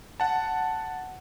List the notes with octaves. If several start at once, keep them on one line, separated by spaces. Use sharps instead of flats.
F#5 A5